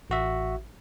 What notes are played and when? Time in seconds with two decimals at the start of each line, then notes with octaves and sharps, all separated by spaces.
0.10 A1 F#4 E5